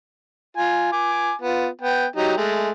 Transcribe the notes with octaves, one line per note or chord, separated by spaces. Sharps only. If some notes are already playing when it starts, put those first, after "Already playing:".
F4 G#5
G#5 D6
B3 F4
B3 G5
F#3 D#4 G4
G#3 A3